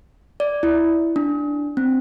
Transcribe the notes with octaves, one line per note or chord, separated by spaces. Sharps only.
D5
E4
D4
C4